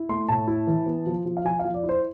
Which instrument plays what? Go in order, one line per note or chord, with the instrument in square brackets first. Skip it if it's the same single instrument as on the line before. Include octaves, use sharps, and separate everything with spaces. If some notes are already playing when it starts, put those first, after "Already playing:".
Already playing: [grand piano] E4
A3 C6
A2 A5
E4
E3
B3
F3
F3
F5
F3 G#5
F5
F3
D5
E4
C5